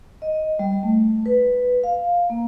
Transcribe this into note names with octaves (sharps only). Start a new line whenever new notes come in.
D#5
G3
A3
B4
F5
A#3